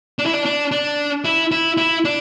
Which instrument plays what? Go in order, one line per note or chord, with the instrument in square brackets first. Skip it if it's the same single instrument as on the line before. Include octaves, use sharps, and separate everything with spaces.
[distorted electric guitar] D4
E4
D4
D4
D4
E4
E4
E4
D4